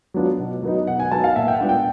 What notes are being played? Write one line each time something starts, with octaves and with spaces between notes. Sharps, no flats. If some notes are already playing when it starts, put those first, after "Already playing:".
F#3 B3 D4 F4
B2
F#3 B3 D#4
B2 F#5
G#5
F#3 B3 D#4 A5
F5
A#2 E5
G5
F#5
G3 B3 D4 F4
G5